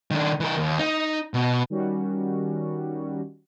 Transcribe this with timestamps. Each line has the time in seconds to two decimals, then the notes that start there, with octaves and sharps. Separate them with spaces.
0.11 D#3 D4
0.40 E3 A#4
0.57 D#2
0.79 D#4
1.34 B2
1.70 D#3 G3 C#4 F#4